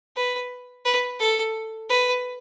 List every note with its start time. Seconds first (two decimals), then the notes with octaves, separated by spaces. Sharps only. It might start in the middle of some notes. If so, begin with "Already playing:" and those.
0.16 B4
0.85 B4
1.19 A4
1.89 B4